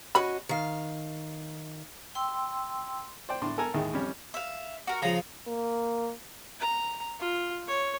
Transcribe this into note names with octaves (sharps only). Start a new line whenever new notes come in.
C#4 F#4 D#5 B5
D#3 F5
G5 C6 E6
C5 D5 G5
A2 D4 C6
A4 A#4 G#5 A#5
D#2 A2 D#3 G#3
F2 G3 C#4
E5 F5
F#4 A#4
C#3 F3 A#5
A#3
A#5
F4
C#5